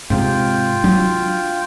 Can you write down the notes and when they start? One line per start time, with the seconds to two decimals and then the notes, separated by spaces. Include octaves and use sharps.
0.10 G#2 C3 F4 G5
0.84 F#3 D4